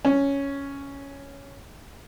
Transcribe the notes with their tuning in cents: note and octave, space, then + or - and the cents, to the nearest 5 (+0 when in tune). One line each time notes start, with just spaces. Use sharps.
C#4 +5